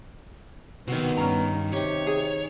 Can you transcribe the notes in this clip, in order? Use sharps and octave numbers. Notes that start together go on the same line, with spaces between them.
B1 C3 D#3 B3 F#4
G2 C#4 A#5
C3 D#4 G4 C#5
G#4